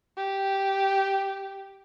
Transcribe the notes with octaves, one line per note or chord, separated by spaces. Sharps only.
G4